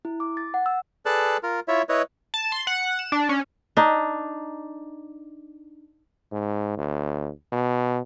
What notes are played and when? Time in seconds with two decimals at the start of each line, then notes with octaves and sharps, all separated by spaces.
0.05 E4
0.20 D6
0.37 A6
0.54 F#5
0.66 E6
1.06 G#4 A4 B4 D5 A5 F#6
1.43 F4 A#4
1.68 E4 F4 C#5 E5
1.89 E4 B4 C#5 D#5
2.34 A5
2.52 C6
2.67 F#5
2.99 E7
3.12 D4
3.29 C#4
3.77 D4 D#4
6.32 G#2
6.78 D2
7.52 B2